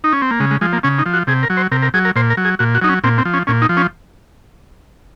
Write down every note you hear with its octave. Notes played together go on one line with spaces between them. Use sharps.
D#4
C#4
C4
A#3
C#3 G#3
G#3
F3 G#3
A#3
C#3 C#4
D#4
F3
F#4
C3 G#4
A#4
F#3
C5
C3 A#4
A#4
F#3 G#4
A#4
A#2 C5
A#4
F#3
G#4
A#2 F#4
F#4
F#3 D#4
C#4
A#2 C4
C4
F3
C#4
A#2 C#4
D#4
F3
C#4